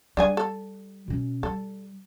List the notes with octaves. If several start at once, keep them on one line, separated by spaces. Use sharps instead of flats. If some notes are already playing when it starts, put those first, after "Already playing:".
G3 D4 G#4 G#5
A4
B2 C#4
G3 A4